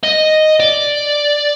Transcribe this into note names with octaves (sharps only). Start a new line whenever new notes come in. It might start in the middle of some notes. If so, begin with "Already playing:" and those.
D#5
D5